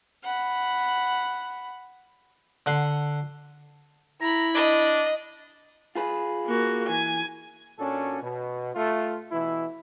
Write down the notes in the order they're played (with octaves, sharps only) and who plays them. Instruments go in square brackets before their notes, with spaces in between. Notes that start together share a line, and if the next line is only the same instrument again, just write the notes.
[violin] F#5 B5
[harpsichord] D3 F#5 C6
[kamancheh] E4 B5 [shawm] A#5
[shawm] D4 [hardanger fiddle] D#5
[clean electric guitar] F4 G#4 B4
[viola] A#3 F#4
[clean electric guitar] E3 [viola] G#5
[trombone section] A#2 C#4 D4 F#4 A4
B2
A3 F4
B2 E3 E4